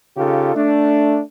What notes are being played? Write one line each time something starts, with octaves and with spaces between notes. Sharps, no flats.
C#3 D#4 F4 G4 A4
A3 D4